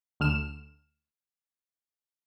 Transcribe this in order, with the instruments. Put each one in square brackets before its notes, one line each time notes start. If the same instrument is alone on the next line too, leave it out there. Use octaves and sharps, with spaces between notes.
[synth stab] D2 D3 F6 E7